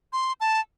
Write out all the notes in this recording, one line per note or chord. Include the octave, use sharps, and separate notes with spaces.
C6
A5